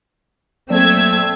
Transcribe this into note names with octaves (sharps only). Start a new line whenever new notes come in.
F#3 A3 A#3 C4 D5 E6 G#6